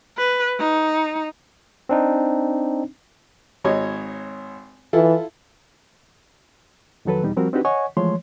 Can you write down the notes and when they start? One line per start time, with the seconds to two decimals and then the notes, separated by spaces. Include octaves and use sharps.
0.18 B4
0.60 D#4
1.89 C4 D4 D#4
3.65 G#1 C#5 D#5
4.93 E3 E4 F4 A4
7.05 F2 D#3 F#3 A4 B4
7.23 E2 B2 G3 D#4
7.36 F3 G3 C4 F#4 A#4
7.53 C4 D4 D#4 F#4 G4 B4
7.65 C#5 D#5 F#5 G#5 C#6
7.97 E3 F3 G#3 A3 C#5 C6